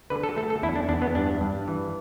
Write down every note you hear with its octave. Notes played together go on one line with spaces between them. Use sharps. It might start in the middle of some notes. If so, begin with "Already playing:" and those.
D3 B4
A4
A3 A4
A4
E2 E4
D4
E2 D4
B3
G2 D4
G2
E3